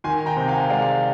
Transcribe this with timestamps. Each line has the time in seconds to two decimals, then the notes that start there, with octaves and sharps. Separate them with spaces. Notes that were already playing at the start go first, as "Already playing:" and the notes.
0.04 D#3 G#5 C6
0.26 G5 A#5
0.37 C3
0.48 F5 G#5
0.70 G#3 D5 F5